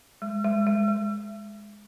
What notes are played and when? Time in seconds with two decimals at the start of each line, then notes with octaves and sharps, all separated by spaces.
0.22 G#3
0.44 G#3
0.67 G#3
0.88 G#3